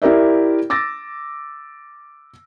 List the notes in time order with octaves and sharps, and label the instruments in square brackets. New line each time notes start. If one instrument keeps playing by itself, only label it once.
[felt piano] E4 G4 A#4 D5 E5
D6 E6 A6 A#6